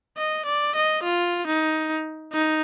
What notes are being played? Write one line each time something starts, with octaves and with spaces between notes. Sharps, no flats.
D#5
D5
D#5
F4
D#4
D#4